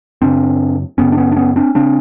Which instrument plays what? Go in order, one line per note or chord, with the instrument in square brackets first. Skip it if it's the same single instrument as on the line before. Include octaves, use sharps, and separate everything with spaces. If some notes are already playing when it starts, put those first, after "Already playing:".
[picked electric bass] F#2 C#3 C4 D4
F#2 C#3 B3 C#4
D4
B3 C#4
D4
B3 C#4
C4 D4
C#3 C4 D4